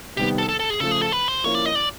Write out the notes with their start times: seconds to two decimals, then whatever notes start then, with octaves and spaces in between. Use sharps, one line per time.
0.17 C3 D#3 G3 B3 G4
0.38 A4
0.49 A4
0.60 A4
0.70 G#4
0.80 C#3 F3 A3 A4
0.91 G#4
1.02 A4
1.12 B4
1.28 C5
1.44 F3 A#3 C#4 E4 C#5
1.54 D5
1.65 D#5
1.75 D5